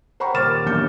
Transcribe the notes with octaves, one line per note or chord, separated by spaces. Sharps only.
C5 F#5 G5 A#5 B5 C#6
D#1 A#4 D6 F6 A6 E7
A1 D#2 B2 D4 G6 C#7